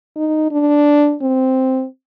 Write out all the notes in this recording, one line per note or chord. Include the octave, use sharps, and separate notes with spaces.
D#4
D4
C4